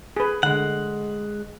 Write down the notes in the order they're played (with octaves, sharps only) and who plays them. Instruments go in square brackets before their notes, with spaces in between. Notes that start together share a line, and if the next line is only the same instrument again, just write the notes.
[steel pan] G#4 B4
[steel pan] D3 [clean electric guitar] G#3 F#5